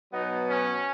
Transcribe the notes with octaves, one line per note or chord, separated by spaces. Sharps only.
B2 F#3 B3 D#4
C#4